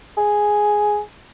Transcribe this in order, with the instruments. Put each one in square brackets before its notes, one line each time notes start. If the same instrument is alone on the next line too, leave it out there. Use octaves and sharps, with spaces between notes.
[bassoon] G#4